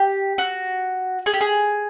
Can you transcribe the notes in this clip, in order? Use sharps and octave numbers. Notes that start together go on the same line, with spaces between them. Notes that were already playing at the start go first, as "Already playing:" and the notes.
Already playing: G4
F#4
G#4
G4
G#4